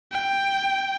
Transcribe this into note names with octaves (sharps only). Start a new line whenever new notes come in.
G5